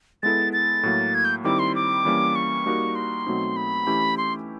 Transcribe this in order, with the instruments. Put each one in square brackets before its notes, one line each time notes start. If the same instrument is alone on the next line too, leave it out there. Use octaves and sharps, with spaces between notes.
[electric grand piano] G#3 B3 E4 A4 [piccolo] A6
[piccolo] A6
[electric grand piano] A2 F#3 A#3
[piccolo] G#6
G6
[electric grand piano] D#3 G3 C4 E4 [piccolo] D6
[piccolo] C6
D6
[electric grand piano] E3 G3 A#3 C#4
[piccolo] C#6
[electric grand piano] G3 A#3 D#4 F#4 A#4
[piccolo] C6
[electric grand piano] B2 F#3 A3 C4 D#4
[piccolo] B5
[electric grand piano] E3 A3 C#4 E4 G4
[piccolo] C6